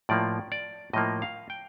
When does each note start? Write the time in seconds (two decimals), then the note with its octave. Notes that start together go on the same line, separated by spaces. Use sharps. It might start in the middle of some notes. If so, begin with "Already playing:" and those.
0.09 A2 F3 A#3 D5
0.52 D5
0.93 A2 F3 A#3 D#5
1.22 F5
1.50 G5